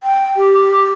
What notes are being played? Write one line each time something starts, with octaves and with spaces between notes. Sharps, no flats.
G5
G4